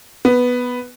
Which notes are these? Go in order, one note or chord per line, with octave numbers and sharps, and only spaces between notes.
B3